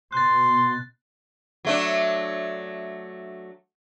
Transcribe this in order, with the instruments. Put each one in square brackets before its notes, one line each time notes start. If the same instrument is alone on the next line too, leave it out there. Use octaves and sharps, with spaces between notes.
[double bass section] B2 [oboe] C6 [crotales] F#6 A6
[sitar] F#3 A3 D4